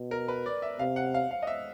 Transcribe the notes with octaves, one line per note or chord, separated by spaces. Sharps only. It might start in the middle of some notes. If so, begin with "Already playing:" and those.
Already playing: B2
A#4
B4
D5
E5
C3 F5
F#5
F5
F5
D#5
E5